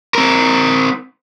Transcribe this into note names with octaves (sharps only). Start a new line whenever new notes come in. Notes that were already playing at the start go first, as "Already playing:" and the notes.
C4 A#4